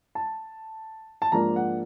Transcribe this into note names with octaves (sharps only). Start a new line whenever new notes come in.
A5
A5
G#2 F3 A#3 D4 A#5
F#5